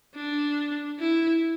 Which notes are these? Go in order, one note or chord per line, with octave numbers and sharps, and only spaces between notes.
D4
E4